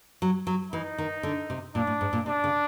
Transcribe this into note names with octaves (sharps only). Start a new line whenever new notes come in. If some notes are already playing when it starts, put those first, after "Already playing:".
F#3
F#3
E3 D#4
D#3
D3
C3
A#2 D4
A2
G#2
A#2
C3 D4
C#3